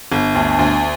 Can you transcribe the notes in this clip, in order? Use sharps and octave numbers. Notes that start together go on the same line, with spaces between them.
G1
D2
D2